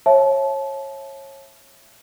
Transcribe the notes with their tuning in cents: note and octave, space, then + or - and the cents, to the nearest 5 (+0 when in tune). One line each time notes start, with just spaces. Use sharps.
C#5 -25 E5 +15 A5 -25